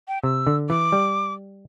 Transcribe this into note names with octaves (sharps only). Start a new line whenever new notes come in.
G5
C3 E6
D3
E3 D6
G3